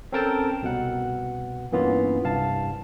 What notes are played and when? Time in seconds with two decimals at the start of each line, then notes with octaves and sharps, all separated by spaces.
0.12 C4 C#4 A4 A#4 G5 A5
0.62 C2 B2 F#5
1.72 G2 E3 A#3 B3 C#4 F4
2.24 C2 G2 F5 A5